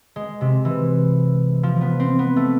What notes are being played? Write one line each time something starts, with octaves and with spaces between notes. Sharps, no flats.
G#3
C3
E3
F3
B3
C4
B3
A3